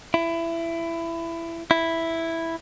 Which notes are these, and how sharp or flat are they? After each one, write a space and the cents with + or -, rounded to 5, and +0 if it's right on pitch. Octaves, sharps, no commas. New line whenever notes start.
E4 +20
E4 +0